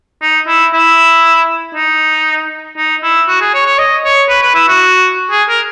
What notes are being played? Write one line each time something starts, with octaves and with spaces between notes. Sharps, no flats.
D#4
E4
E4
D#4
D#4
E4
F#4
G#4
C#5
C#5
D#5
C#5
B4
B4
E4
F#4
G#4
A#4